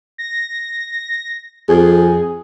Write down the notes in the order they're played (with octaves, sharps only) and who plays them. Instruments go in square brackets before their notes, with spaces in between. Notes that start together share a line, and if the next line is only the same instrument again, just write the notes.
[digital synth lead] A#6
[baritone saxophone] F2 [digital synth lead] G#4